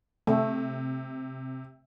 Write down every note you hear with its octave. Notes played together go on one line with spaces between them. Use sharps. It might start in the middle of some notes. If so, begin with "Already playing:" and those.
C3 A3